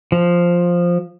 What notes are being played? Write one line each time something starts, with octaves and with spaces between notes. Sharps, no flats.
F3